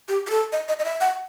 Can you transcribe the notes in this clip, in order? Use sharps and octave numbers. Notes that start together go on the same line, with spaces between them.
G4
G4
A4
D#5
D#5
D#5
E5
F#5